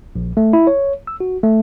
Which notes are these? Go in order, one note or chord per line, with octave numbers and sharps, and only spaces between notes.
A#1
A3
E4
C#5
E6
F#4
A3